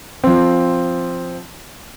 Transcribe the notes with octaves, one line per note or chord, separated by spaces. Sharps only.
F3 C4